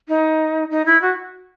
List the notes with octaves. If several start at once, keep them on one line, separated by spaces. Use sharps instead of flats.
D#4
D#4
E4
F#4